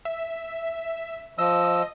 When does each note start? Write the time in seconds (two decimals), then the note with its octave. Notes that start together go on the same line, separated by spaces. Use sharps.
0.05 E5
1.38 F3 D#5 E6